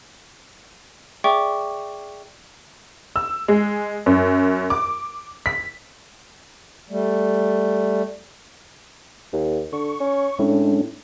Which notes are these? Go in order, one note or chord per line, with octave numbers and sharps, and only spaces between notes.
G#4 D5 E5 G5 C#6 D6
E6
G#3
F#2
D6
B6
G3 A3
D#2
D3 C#6
C#4
A2 G#3 C#4 D4